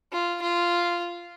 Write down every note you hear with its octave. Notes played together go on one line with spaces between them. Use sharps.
F4
F4